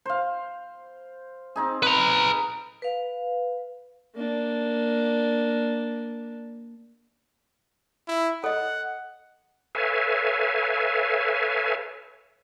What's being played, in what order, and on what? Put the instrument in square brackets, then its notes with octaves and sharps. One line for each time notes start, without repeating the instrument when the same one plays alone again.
[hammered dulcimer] C5 F5
C4 D#4 G#4
[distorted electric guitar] B4 A#5 [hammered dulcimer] B5
[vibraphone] B4 F5
[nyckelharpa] A#3 D4
[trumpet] E4
[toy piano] A4 D#5 [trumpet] F#5
[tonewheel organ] A4 B4 C#5 E5 F5 G#5